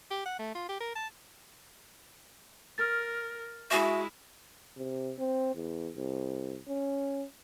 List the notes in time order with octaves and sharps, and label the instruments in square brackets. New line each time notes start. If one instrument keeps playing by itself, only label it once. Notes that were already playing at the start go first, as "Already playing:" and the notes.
[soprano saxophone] G4
F#5
A3
F4
G4
A#4
A5
[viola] A#4 [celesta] F6 A6
[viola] G#3 E4 [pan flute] F#4 [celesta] E5 G#5 D#6
[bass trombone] C3
C4
E2
C2
C#4